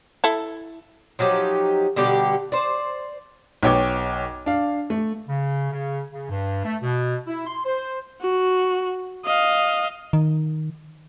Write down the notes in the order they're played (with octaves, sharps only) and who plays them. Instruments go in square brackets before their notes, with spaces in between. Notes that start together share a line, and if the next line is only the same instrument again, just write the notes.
[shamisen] E4 A4
[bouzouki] F3 F#3 D#4 G4
B2 D3 G3 G4
C5 D5
[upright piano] B1 B3 C#5 G5 D6 G#6
D4 F5
A3
[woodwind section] C#3
C#3
C#3
G2
A3
B2
E4
C6
C5
[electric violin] F#4
D#5 F5
[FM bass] D#3